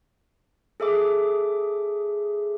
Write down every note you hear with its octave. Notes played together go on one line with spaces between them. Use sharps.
G#4 A4 E5 D6